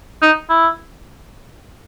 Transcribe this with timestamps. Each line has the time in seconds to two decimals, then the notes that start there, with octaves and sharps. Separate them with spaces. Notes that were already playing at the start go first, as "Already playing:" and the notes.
0.22 D#4
0.50 E4